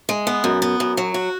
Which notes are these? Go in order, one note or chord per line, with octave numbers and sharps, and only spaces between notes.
G#3
B3
F#2
B3
F#2
F#3
F#4